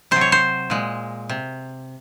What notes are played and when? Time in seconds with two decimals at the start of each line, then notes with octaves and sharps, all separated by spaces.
0.11 C3 F#3 C5
0.21 C#5
0.32 C5
0.70 A#2 G#3
1.29 C3